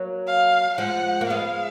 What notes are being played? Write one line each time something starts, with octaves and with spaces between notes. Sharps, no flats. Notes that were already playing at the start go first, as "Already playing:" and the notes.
Already playing: F#3 A#3
F5
F3 G#3 F#5
A#3
G#3 B3 F5